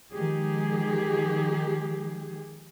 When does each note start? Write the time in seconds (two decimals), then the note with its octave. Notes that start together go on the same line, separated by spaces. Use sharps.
0.12 D#3 F3 G#3 G4 G#4